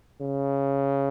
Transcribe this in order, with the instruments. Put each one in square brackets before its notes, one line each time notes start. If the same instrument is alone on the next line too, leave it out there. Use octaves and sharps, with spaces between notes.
[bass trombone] C#3